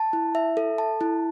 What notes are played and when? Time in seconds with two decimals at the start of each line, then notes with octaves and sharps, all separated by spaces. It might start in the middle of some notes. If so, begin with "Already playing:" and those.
Already playing: A5
0.13 E4
0.35 E5
0.57 A4
0.78 A5
1.01 E4